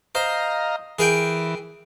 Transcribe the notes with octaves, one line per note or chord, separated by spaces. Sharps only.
C5 D#5 F5 A#5
E3 G#4 A#4 G5